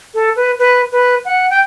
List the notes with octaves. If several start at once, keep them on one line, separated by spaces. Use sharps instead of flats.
A4
B4
B4
B4
F#5
G5